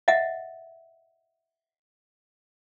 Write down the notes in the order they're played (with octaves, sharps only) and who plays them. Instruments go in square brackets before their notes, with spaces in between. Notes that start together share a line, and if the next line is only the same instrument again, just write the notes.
[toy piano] D#5 E5 F#5